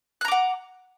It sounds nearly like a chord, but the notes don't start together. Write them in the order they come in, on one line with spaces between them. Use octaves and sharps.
F#6 A#5 D6 F#5